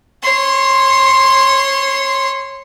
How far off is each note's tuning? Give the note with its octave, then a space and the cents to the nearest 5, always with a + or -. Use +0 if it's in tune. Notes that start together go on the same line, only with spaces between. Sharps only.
C#5 -25 C6 +0